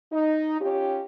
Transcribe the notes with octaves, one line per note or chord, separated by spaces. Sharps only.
D#4
C#4 F4 G4